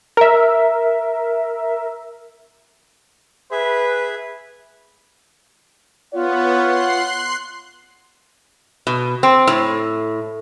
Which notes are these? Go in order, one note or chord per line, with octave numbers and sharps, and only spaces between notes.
A#4 E5
G#4 B4 E5
B3 F4 C#5 F#5
C6 F#6 C7
B2
C4
A2